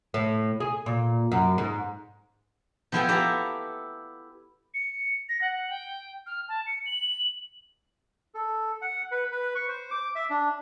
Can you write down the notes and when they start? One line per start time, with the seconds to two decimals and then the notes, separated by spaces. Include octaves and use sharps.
0.14 A2
0.60 G#4
0.86 A#2
1.32 F#2
1.58 G#2
2.92 F3 B3 E4 G#4 A4 G5
3.09 B3 G4 A4 E5 A#5
4.74 C#7
5.29 A#6
5.41 F#5
5.70 G5
6.27 F6
6.49 A5
6.67 C#7
6.86 F#7
8.35 A4
8.82 F#5
9.12 B4
9.32 B4
9.55 C#6
9.68 C5
9.91 D6
10.15 E5
10.30 D4